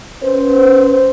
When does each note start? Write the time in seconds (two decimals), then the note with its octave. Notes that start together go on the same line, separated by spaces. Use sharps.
0.22 C#4 B4 C5